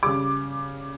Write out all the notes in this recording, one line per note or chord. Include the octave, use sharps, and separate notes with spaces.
C#3 G3 D6